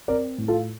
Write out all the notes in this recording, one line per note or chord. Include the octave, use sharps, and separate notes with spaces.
C4 A#4 D5
A2
F4 A4